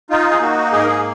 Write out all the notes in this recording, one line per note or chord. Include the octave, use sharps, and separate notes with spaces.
D#4 F4
G#4
A#3 F#4
G#2 G#4
A#4
G#4